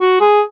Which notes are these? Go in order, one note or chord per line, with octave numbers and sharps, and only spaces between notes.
F#4
G#4